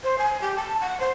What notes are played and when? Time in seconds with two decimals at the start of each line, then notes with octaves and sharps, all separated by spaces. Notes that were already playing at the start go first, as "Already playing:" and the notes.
0.03 C5
0.18 G#5
0.42 G4
0.56 A5
0.81 F#5
1.00 C5